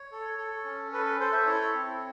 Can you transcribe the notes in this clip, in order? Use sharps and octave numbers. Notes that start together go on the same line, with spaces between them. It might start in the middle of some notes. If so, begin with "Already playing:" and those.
Already playing: C#5
A4
A4
C#4
A4 B4
B4
A4 C5
E5
E4 C#5
C4